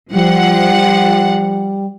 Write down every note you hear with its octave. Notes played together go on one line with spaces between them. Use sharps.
F3 G3 F#5